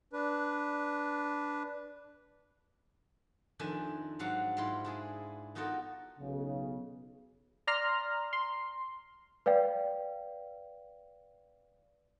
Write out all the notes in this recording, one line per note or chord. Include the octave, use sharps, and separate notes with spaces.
D4 B4
F2 D#3 D4 E5 G#5 A5
G#2 F#3 D4 F5 F#5
G#2 E4 F4 B5 C6
D4 E4 G#4
B3 D#4 F4 F#4 A4 A#4
B1 C#3
D5 A#5 C6 F6
C6
B4 D5 F5 G5